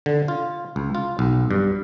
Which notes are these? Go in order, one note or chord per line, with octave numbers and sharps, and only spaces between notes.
D3
F4
C#2
F4
B1
G2